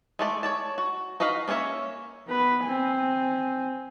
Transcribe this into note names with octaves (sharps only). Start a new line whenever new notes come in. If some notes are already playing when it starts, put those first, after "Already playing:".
G#3 A3 D5
C#5 D5 A5
F#4
D#4 F#4 B4 F5
A#3 C#4 G#4 C#5 E5
B3 B4
C4 G#5